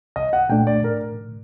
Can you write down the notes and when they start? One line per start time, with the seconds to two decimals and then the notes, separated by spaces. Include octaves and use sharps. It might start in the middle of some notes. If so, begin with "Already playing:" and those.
0.16 C2 D#5
0.33 F#5
0.49 A#2 A3 D4 G5
0.67 D5
0.83 A2 A#4